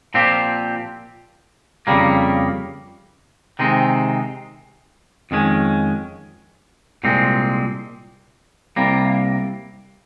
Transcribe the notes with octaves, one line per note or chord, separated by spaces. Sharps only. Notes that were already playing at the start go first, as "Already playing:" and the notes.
A#2 F3 C4 G4
F2 C#3 G3 A#3
C3 D#3 G#3 C4 D#4
F2 D#3 G#3 C#4
C2 A#2 G#3 C4
C2 C3 G3 A#3